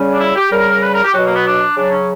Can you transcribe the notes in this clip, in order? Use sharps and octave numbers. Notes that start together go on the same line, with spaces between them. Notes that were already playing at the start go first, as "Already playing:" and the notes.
Already playing: C#3 G3 C#4
D4
E4
G4
C#3 G3 A#4
B4
A#4
G4
B2 F#3 F#4
A#3
B3
D4
C#3 F#3 D4
C#4